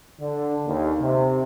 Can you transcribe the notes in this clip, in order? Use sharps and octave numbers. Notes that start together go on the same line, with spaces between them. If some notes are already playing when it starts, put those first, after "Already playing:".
D3
D#2
C3